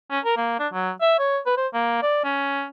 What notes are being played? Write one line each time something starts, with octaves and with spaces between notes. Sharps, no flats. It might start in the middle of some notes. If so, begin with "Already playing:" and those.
C#4
A#4
A#3
D4
F#3
E5
C#5
B4
C5
A#3
D5
C#4